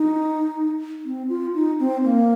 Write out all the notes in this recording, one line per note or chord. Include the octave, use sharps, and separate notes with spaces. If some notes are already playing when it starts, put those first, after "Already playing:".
Already playing: D#4
C4
F4
D#4
C4
A#3